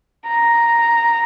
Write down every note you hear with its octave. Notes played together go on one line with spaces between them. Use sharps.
A#5